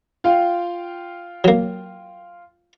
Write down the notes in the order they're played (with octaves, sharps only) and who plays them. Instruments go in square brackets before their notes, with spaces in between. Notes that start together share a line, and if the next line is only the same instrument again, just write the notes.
[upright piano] F4 F5 G5
[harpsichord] F#3 A#3